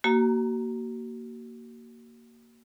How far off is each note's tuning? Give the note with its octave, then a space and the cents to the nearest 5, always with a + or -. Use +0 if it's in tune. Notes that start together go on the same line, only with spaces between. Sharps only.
A#3 +0 F#4 +35 A#5 -25